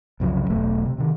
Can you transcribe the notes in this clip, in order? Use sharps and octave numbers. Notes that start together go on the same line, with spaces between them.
C2 F#2 C#3 F3
E1 B1 A3
C3
C3 D#3